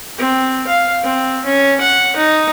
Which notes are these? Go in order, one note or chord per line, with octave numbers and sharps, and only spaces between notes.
C4
F5
C4
C#4
F#5
D#4